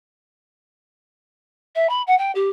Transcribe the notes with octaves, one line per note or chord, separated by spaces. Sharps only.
E5
B5
F#5
G5
G4